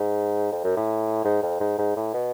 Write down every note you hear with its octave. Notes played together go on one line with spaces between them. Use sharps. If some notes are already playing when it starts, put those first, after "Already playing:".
Already playing: G#2
F2
F#2
A2
G#2
F2
G#2
G#2
A2
B2